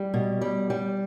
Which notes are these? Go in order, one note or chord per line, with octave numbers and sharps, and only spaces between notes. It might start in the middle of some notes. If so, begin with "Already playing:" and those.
Already playing: G3
B2
G3
G3